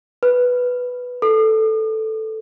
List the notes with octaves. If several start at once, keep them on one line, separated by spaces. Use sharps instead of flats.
B4
A4